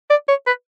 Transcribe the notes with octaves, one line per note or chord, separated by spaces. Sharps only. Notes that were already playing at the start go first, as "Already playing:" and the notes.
D5
C#5
B4